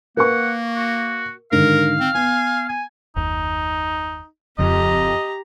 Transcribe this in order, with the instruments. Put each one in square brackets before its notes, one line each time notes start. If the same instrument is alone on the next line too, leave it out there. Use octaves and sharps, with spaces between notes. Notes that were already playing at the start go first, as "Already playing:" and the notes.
[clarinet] A#3 [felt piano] A#4 B4 C#6 [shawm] F#5
[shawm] F#4
[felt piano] G#2 D3 D#3 [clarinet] A#4 [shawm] F5
[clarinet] C4
[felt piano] B3 [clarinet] G#5
[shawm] G#5
[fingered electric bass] F#1 D#2 [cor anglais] D#4
[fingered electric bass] D1 C#3 C4 [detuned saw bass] F2 [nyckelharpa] G4 A#5 [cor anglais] D#5